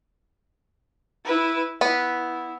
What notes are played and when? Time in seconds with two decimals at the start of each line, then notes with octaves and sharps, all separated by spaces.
1.25 E4 B4
1.81 B3 E4 B4